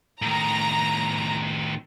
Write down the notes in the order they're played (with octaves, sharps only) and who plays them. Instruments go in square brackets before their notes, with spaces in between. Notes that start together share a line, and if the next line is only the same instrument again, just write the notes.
[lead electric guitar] A2 D#3 [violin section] A#5